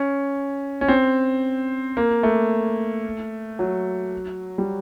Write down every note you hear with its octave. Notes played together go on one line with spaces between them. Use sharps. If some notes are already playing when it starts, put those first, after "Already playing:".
Already playing: C#4
C#4
C4
A#3
A3
F#3
G3